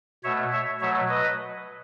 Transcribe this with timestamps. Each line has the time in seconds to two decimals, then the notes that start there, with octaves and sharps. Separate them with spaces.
0.24 B2 A3 C#5 E5
0.52 C#5 E5
0.81 B2 F#3 A3 C#5 E5
1.09 B4 D#5